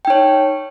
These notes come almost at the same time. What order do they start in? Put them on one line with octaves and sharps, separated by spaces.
G5 D#4 C#5